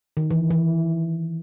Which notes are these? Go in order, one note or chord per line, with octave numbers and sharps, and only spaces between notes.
D#3
E3
E3